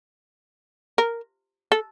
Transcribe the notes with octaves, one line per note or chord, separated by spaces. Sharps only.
A#4
A4